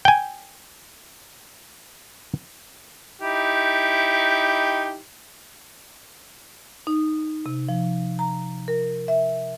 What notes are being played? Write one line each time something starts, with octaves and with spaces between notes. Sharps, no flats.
G5 G#5
D#4 E4 G4
D#4
C3
F3
A#5
A#4
E5